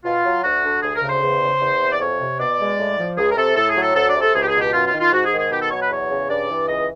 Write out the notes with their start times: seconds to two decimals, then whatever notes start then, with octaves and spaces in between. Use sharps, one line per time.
0.05 B2 F4
0.24 F#3
0.44 D2 F#4
0.63 D3
0.82 D2 G#4
0.96 A#4
1.03 C#3
1.09 C5
1.22 E2
1.41 C#3
1.60 E2
1.81 C3
1.92 D5
2.00 F2 C#5
2.20 C3
2.39 B2 D5
2.59 G#3
2.78 A2
2.97 F3
3.17 C#2 G#4
3.31 A#4
3.37 C3 A4
3.56 A2 A4
3.69 G#4
3.76 F#3
3.82 A4
3.95 D2 A4
4.09 D5
4.15 C3
4.21 A4
4.35 C#2 G#4
4.42 G4
4.47 G#4
4.54 B2
4.61 G4
4.73 F#2 F4
4.87 F4
4.93 D#3
4.99 F4
5.12 G#2 F#4
5.25 G#4
5.32 D#3
5.38 G#4
5.51 B2 G4
5.61 A4
5.71 F#3 C#5
5.81 B4
5.90 E2 C#5
6.10 C#3
6.29 G2 D5
6.49 E3
6.68 C#2 D#5